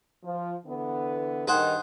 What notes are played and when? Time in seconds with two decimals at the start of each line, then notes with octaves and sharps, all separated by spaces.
0.24 F3
0.66 D3 E3 B3
1.48 G2 D#3 G#4 C5 F#5